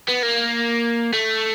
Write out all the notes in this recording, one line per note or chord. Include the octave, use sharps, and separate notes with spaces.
B3
A#3
A3